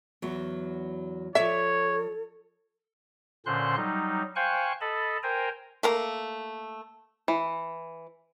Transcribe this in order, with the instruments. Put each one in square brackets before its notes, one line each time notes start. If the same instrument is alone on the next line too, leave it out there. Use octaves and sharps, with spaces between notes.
[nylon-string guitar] E2 F#3
[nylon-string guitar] F3 D5 [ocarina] A4 [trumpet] C#5 [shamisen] E5
[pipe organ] A#2 D3 C#4 C5 C6 F#6
F#3 G3 D#4
C5 F5 G5 G#5 C#6 F#6
A4 D#5 A5 B5
A#4 C5 G5 G#5 A#5
[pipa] A3 A#3 A#5
[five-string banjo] E3